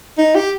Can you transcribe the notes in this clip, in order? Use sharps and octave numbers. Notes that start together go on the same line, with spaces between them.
D#4
G4